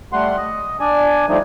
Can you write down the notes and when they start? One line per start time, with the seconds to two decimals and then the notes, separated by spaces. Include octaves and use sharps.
0.13 G3 A3 F#5 C6
0.37 D#5
0.80 D4 D5 G#5
1.29 F3 G3 A3 D4 D#4